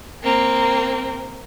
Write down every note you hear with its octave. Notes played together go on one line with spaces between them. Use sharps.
A#3 C4